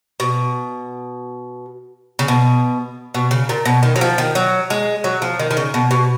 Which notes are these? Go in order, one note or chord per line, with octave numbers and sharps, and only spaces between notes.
B2
C#3
B2
B2
C#3
A#2
B2
D#3
F#3
F3
D#3
F#3
G#3
F#3
F3
D#3
D#3
C#3
B2
B2